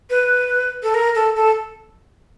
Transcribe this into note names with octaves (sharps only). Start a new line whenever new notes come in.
B4
A4
A#4
A4
A4